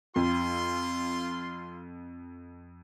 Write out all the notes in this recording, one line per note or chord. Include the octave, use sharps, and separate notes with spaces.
F2 F4 C6